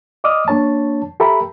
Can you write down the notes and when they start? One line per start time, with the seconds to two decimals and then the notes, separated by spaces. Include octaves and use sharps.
0.24 D5 D#5 D6 D#6 F6
0.48 A#3 D4 C#5 A5
1.20 G4 A4 A#4 E5 B5